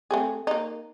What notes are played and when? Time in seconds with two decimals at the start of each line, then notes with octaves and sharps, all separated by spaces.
0.11 A3 C4 G#4
0.47 A#3 D#4